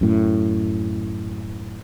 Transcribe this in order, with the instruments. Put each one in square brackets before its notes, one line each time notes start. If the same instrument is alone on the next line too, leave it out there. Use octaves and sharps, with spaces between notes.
[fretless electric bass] F#2 A2